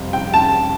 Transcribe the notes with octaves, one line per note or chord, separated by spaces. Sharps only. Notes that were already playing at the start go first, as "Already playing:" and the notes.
Already playing: F2 C3 G3 G4
G5
A5